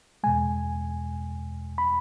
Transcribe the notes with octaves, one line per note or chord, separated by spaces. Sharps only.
E2 B2 G#3 G#5
B5